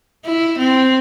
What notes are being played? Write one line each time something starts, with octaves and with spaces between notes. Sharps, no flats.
E4
C4